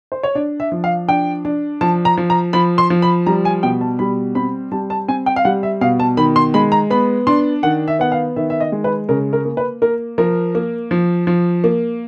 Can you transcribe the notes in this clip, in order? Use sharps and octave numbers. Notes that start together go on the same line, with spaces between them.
C5
C#5
D4 D5
E5
F3
F5
D4 G5
D4
F3 A5
A#5
F3
A#5
F3 B5
C6
F3
B5
G3 A#5
G#5
B2 G5
A5
G3 B5
C4 B5
G3 A5
A5
C4 G#5
G5
F5
G3 F#5
E5
B2 F5
A5
D#3 B5
C6
G#3 B5
A#5
B3 B5
D4 C6
D#3 F#5
E5
B3 F#5
F5
D#3 E5
E5
D#5
G#3
B4
C#3 A#4
A#4
A#3
B4
A#3 A#4
F3 A#4
A#3
F3
F3
A#3